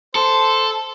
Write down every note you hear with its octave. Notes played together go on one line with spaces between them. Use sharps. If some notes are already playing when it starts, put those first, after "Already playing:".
A4 C5